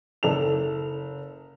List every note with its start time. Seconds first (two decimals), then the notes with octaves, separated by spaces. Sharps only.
0.23 F#1 A4 F7